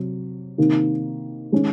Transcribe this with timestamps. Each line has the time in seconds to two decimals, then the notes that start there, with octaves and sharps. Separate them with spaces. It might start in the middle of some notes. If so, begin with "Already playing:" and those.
Already playing: C3 F#3
0.58 C3 D#3 A#3 D#4
1.52 D#3 G#3 C#4